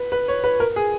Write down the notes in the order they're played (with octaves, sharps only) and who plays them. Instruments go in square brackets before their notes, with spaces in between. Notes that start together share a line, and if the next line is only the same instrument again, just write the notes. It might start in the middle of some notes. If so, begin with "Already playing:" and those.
Already playing: [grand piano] B4
B4
C#5
B4
A#4
G#4